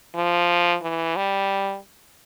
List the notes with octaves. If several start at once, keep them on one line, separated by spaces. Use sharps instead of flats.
F3
E3
G3